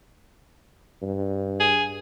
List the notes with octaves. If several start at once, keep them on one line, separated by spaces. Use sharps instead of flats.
G2
G#4